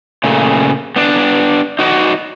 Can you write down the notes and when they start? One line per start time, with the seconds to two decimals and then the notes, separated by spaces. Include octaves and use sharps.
0.24 A#2 C#3 A3
0.96 B3 D4
1.79 D#4 F#4 D5 D#5